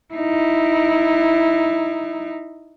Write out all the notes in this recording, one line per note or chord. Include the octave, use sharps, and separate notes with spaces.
D#4 E4